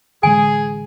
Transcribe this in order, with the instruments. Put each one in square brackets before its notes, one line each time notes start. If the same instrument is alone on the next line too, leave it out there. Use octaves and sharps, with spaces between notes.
[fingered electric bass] A1 D3 G#3 [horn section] G#4 [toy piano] G#5